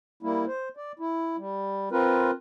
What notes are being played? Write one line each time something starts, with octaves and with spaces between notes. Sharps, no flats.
G3 A#3 E4
C5
D5
E4
G3
C4 F4 A#4 B4